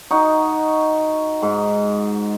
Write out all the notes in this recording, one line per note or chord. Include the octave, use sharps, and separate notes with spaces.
D#4 F#4 D#5
G#2